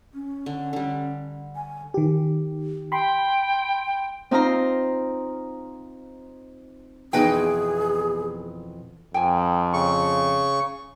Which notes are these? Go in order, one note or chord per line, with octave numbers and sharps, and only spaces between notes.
C#4
D3
D3 G3
G#5
D#3 G4
G5 B5 C6
C4 D#4 F4 A#5 C6
F2 B2 E3 D#4 G#4 B4 G5
F2 G5 G#5
C#3 C#6